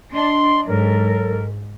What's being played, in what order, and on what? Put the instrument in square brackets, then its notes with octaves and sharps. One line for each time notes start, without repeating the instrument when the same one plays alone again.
[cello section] D4 [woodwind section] D#5 C6
[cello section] G#2 [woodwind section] F#3 A4 A#4